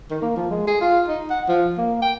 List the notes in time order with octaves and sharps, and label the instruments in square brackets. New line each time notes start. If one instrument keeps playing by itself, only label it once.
[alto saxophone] D#3
A#3
F3
G#3
G#4
F4
D#4
F#5
F3
A#3
G5